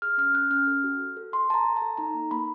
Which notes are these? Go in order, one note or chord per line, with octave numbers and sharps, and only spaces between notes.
G#4 F6
C#4 F6
C#4 F#6
C#4 F6
A4
F#4
A4
A4
A4 C6
A4 A5
A#5
A4
A4 A5
D#4 A#5
A#3
A#3 B5